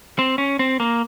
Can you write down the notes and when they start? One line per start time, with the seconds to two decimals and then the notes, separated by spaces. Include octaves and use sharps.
0.19 C4
0.38 C#4
0.59 C4
0.80 A#3